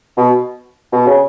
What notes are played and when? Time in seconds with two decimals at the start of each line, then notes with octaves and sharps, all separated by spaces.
0.18 B2
0.93 B2
1.07 C#3